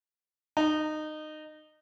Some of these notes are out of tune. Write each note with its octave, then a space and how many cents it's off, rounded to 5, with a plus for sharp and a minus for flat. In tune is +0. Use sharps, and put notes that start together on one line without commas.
D#4 -20